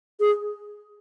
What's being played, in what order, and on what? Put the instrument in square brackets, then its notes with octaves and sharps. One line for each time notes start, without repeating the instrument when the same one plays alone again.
[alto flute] G#4